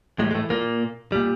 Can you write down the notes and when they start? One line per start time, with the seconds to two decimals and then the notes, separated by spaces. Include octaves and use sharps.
0.19 A2 E3 G3 G#3
0.31 G#3
0.35 A2 A3
0.50 A#2 A#3
1.12 A#2 G3